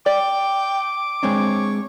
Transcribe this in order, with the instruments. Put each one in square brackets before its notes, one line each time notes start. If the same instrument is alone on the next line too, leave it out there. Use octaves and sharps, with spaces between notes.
[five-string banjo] D5 [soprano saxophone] G5 [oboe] D6
[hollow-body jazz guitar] G#3 C4 D4 [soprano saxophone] C#5